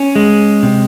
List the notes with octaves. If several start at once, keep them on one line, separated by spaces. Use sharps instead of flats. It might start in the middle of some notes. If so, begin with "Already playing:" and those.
Already playing: C#4
G#3
C3